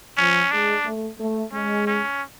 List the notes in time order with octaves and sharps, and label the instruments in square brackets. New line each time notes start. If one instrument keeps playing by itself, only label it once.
[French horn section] F3 [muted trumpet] C#4
[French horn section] G#3 [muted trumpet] D4
[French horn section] A3
A3
[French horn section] G#3 [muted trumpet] C#4
[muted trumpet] C#4